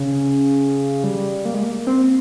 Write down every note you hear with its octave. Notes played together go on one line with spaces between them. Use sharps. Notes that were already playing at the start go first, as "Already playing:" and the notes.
Already playing: C#3
G3
A#3
G#3
A#3
C4